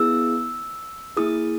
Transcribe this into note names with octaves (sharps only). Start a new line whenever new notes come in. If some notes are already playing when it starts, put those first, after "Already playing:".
Already playing: B3 E4 G#4 E6
A#3 E4 G#4 D#6